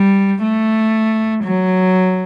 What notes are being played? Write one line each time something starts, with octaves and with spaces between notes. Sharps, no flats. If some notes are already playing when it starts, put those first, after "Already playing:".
Already playing: G3
A3
F#3